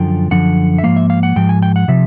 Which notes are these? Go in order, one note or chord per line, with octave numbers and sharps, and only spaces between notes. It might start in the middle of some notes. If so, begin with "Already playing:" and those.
Already playing: F#2 D3 F3 G5
F#2 D3 F3 F#5
E5
G#2 F3 A#3 F5
E5
F5
F#5
G#2 F3 G5
G#5
G5
F#5
C3 F3 E5